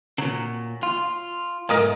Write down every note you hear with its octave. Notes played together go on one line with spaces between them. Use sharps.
A#2 C#3 F#3
F4
B1 G#2 A3 A#4 D#5 F5